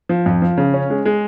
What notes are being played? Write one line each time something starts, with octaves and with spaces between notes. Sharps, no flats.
F3
F2
F3
C#3
C#4
G#3
G#3